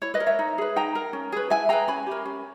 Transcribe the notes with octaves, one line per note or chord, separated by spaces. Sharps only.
E4 C#5
B4 D#5
A#4
C#5 E5
D#4
G#4 B4
D#4 G5 A#5
A#4
C#4
G#4 B4
E4 E5 G#5
G#4 B4 G5 A#5
C#4 G#5 B5
G4 A#4
C#4